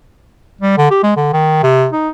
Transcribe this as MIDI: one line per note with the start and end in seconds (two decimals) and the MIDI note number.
0.61 0.76 55
0.77 0.88 50
0.90 1.01 67
1.03 1.13 56
1.17 1.31 50
1.33 1.63 51
1.63 1.88 48
1.93 2.09 63